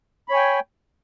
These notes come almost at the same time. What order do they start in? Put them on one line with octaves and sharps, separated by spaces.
B5 C#5 G#5 G5